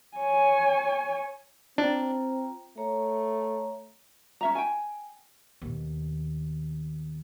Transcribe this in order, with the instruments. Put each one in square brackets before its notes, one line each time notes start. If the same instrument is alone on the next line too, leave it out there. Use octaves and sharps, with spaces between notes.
[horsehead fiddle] C#5 G#5
[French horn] C4 [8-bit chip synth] D4 [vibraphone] F4 G5 A#5
[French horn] A3 [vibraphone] C#5 A#5
[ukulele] C#4 E5 A#5
G5 G#5
[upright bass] D#2 B2